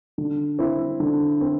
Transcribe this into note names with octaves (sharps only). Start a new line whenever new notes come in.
D3
C4 E4
D3
C4